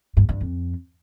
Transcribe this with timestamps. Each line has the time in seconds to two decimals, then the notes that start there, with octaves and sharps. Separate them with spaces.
0.17 G2
0.29 G2
0.41 F2